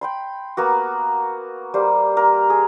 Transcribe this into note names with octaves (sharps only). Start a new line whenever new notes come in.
G5 B5 C6
A#3 B3 F#4
G3 A#3 C5
A#3 A#4
G#4